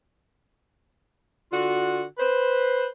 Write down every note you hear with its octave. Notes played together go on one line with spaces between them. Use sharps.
D3 F4 F#4
B4 C5